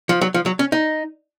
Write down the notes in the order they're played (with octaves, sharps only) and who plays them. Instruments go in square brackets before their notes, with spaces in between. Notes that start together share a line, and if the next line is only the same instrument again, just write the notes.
[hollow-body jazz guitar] F3
F#3
F3
F#3
C#4
D#4